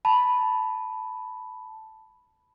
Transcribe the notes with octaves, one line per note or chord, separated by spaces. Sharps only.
A5 B5